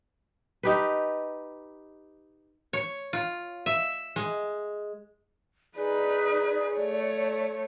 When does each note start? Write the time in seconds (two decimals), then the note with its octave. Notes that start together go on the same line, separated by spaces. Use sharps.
0.63 D#4 G4 B4
2.73 C#5
3.13 F4
3.66 E5
4.16 G#3
5.77 D#4 G#4 B4 D5
6.75 A3 C#5